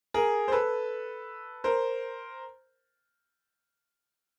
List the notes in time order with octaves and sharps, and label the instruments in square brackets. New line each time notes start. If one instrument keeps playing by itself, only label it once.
[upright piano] G#4 A#4
C5
A4 B4
A#4 C5